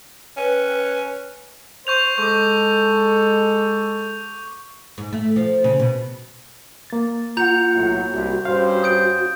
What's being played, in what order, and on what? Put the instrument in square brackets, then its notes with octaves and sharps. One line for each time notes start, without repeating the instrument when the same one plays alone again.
[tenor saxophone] C#4 [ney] B4
[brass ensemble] C5 [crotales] C#6 G6 F7
[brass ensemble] G#3 A4 [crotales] C#6 D6
[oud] G#2
A3
F3
C#3
B2
[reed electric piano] A#3 A6
[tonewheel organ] F4 F#5 [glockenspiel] A#5 G6 F7
[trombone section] B1 A2 F#3
[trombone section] C2 [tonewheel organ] F#4
[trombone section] G2 C#4 C5 [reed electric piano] F5
[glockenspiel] D#6 G6 D7